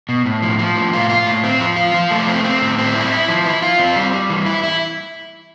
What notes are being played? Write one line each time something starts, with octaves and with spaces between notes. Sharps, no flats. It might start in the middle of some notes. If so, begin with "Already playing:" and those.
B2
A2
F3
F3
A2
F4
F4
A2
C4
F3
F4
F3
A3
C4
C4
A2
C4
E4
E4
F3
E4
F4
C4
G3
G3
E3
E4
E4